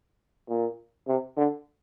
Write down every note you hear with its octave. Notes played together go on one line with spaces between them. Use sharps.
A#2
C3
D3